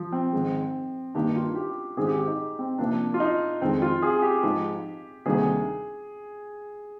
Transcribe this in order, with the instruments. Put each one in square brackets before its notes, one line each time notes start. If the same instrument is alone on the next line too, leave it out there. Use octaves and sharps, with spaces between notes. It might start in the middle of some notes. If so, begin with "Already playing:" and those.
Already playing: [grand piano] F3
C4
[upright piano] G#2 D#3 G#3
[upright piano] G2 D#3 A#3 D#4 G4 [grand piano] D4
[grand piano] F4
G4
[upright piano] G#2 D#3 G#3 C4 [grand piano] G#4
[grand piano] G4
G4
D#4
C4
[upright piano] C3 F3 A#3 [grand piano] D4
[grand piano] F4
D#4
[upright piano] F2 D#3 G#3 [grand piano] C4
[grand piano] F4
G#4
G4
[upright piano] G#2 F3 G#3 D#4
[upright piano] D2 C3 D#3 G3 A#3 [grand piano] G#4